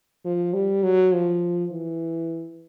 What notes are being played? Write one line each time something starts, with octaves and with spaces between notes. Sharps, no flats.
F3
G3
F#3
F3
E3